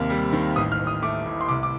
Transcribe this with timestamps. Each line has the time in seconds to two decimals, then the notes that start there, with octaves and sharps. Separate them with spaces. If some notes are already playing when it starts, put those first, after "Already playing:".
Already playing: D#2 C3 A#3 F6
0.10 G3
0.33 D#3
0.56 A1 D#6
0.72 F6
0.79 A1
0.87 D#6
1.02 A3 D6
1.26 A2
1.41 C6
1.48 C2 D6
1.63 D6